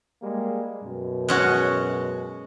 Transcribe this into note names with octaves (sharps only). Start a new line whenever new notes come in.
G3 G#3 A#3
F#2 B2
G#3 C#4 F#4